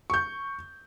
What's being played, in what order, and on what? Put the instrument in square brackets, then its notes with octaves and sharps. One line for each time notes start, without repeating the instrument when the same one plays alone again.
[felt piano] C#6 G6